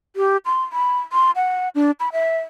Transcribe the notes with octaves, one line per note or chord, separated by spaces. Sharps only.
G4
C6
B5
C6
F#5
D4
B5
E5